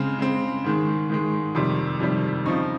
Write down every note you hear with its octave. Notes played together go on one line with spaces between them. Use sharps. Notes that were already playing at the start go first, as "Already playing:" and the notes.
Already playing: C#3 G#3 C4
C#3 G#3 C4
G#2 D#3 G#3
G#2 D#3 G#3
F2 C3 D#3 G3 C6
F2 C3 D#3 G3
C#3 F3 C4 D#4 C#6